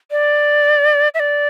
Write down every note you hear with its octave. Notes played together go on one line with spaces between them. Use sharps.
D5
E5
D5